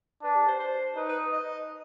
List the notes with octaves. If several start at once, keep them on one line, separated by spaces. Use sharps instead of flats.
D4 B4
G4
C5
C5
D#4 B4
B4
D#5